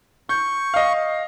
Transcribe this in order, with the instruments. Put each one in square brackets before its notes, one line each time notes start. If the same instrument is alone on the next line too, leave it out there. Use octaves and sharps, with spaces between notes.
[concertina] C#6 [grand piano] G6
[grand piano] D#5 F5